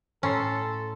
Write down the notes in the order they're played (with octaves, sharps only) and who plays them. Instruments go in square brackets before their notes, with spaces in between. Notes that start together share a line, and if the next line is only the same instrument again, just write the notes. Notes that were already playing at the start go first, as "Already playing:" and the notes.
[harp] A2 A#5 C6 [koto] C#4 [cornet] A4